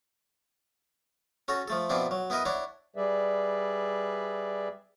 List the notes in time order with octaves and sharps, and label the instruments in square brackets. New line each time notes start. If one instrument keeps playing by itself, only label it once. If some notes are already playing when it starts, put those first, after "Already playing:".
[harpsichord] C#4 F#4 A4 A#5
F3 A3 A4
B2 F3 C4 D4 E4
F#3
B3 E4 A#4 B4 D#5
D4 E4 C#5 F#5
[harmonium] G3 G#4 B4 D5 E5